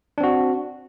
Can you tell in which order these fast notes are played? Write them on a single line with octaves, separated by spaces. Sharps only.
D4 C4 F#4